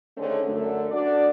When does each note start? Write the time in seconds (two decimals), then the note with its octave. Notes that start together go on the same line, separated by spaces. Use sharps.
0.17 D3 D#3 G#3 A3 C4 C#4
0.46 F#2 D3 A3
0.91 D2 D4 F#4 D5